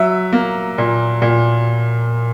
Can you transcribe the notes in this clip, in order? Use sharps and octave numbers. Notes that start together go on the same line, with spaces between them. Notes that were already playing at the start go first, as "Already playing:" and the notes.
Already playing: F#3 E5
A#3
A#2
A#2